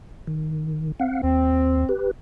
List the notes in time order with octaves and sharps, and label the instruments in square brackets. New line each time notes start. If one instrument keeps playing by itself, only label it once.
[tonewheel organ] D#3
C4 F5 F#5
[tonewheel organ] D#2 [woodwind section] C4
[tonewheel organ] G4 B4